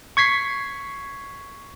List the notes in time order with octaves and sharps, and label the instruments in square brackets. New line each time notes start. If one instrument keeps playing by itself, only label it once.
[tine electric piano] C#6 G#6 B6 C7